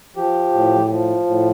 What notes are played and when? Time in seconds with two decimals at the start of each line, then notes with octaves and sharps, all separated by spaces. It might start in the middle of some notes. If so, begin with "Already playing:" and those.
0.16 F3 G4
0.54 A2
0.90 F3
1.26 A2